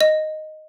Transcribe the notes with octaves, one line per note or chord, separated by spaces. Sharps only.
D#5